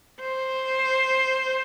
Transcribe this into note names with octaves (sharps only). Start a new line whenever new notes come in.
C5